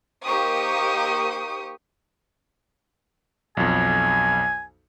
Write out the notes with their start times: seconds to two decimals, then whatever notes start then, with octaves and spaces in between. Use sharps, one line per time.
0.24 A#3 D#4 G4 C5 C#6 D#6
3.57 B1 F2 G#5